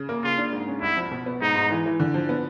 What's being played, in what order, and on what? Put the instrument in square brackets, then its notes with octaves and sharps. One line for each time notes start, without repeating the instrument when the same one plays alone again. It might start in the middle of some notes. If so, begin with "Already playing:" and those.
Already playing: [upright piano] C#3
A#3
[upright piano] C#3 [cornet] F4
[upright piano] D4
G#2
C#4
[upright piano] C2 [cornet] E4
[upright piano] F3
B2
B3
[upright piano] G#2 [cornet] D#4
[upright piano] G#2
E3
E3
D3
F3
B3